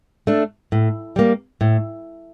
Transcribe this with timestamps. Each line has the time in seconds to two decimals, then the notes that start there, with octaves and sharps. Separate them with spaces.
0.27 A3 D4
0.72 A2
1.16 G3 A#3
1.61 A2